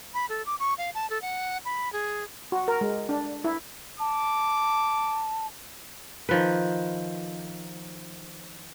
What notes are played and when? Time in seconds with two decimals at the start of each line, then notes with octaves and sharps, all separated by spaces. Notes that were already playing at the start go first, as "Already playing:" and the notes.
0.14 B5
0.29 A4
0.46 D6
0.60 C#6
0.78 F5
0.95 A5
1.10 A4
1.22 F#5
1.65 B5
1.93 G#4
2.52 F#4
2.68 A#4
2.81 G#3
3.09 D4
3.44 E4
4.00 A5 D6
6.29 D#3 F3 B4